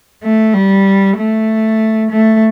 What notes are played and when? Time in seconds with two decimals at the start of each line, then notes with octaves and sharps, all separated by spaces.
0.23 A3
0.54 G3
1.18 A3
2.11 A3